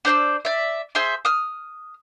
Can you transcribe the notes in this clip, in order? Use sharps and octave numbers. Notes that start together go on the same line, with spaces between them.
D4 C5 D5 E6
D5 E5
G#4 C5 E5 C6
D#6 F6